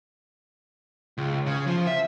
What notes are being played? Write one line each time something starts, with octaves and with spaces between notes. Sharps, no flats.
C#2
C#3
F3
E5